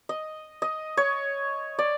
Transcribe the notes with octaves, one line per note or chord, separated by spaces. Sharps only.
D#5
D#5
C#5
D5